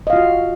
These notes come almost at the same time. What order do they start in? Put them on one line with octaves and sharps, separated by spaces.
D#5 F5 F4 F#4